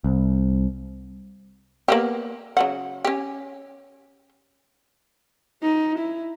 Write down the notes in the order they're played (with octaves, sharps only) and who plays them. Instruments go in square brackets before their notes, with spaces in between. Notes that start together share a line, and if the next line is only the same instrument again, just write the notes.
[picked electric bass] C2
[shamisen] A#3 B3 G4
C#3 F#3 F#5
C#4 G4
[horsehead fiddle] D#4
E4